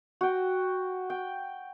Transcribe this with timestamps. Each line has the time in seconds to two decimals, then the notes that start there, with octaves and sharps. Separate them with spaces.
0.21 F#4 G5
1.10 G5